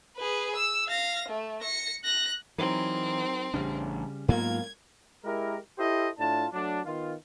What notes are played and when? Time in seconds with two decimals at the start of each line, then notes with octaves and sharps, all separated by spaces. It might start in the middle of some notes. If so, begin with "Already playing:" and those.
0.18 G#4 B4
0.56 E6
0.87 F5 A#6
1.28 A3
1.62 A#6 C#7
2.04 F#6 A#6
2.58 E3 F#3 C4 D#4 A#4
3.54 A1 C#3 G3 D4
4.28 G#2 F#3 A#3 B3 F4 A#4 G#6
5.25 G#3 E4 G4 A#4
5.78 E4 G4 A4 C5 D#5
6.19 A2 D4 F4 A5
6.53 F#3 A3 D4
6.85 D#3 B3 F4